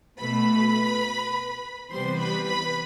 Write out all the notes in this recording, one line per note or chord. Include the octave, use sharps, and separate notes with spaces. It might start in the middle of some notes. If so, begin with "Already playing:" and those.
B2 A3 B4 B5
C3 E3 G3 B3 C5 C6
B4 B5
B4 B5